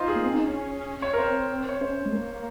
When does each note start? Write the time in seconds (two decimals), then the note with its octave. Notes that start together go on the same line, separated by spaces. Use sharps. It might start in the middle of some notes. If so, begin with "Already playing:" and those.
Already playing: D#4 F4 C5
0.08 G#4
0.16 A#3
0.24 C4
0.34 D#4
0.45 C#4
1.02 C#5
1.13 A#4
1.18 C4 C5
1.69 C#5
1.81 C#4 C5
2.06 G#3
2.13 A#3